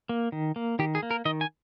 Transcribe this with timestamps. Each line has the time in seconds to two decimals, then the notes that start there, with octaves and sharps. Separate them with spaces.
0.09 A#3
0.32 D#3
0.56 A#3
0.79 D#3 G4
0.95 G#4
1.03 A#3
1.11 A#4
1.25 D#3 D#5
1.41 G#5